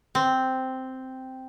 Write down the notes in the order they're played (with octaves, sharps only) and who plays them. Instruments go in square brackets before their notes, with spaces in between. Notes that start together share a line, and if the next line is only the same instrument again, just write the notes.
[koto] C4